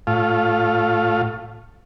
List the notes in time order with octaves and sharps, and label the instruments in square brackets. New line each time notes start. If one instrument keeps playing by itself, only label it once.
[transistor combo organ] A2 F4